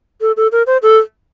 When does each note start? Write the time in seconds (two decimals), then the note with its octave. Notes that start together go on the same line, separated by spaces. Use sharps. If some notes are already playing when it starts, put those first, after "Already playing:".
0.21 A4
0.37 A4
0.52 A#4
0.67 C5
0.83 A4